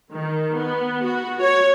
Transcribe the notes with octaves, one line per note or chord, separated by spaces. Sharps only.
D#3
B3
F#4
C#5